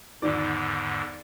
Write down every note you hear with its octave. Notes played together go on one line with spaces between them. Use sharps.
E2 G#2 D3 D#3 D5